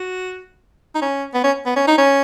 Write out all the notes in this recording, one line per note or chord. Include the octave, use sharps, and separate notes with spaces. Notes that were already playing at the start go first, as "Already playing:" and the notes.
Already playing: F#4
D#4
C#4
B3
C#4
B3
C#4
D#4
C#4